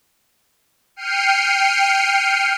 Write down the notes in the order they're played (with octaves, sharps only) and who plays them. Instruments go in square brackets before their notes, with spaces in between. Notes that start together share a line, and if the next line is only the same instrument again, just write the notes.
[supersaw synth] G5 F6 C7 C#7 D#7